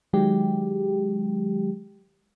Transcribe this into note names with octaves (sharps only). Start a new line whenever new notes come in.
D#3 F#3 G#3 G4